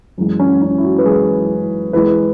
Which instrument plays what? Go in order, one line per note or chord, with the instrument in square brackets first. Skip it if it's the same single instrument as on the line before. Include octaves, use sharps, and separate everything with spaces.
[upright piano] F#2 E3 G#3
C#4
C#4
E4
F#4
B4
F#2 E3 G#3 G#4
E2 E3 G#3 B4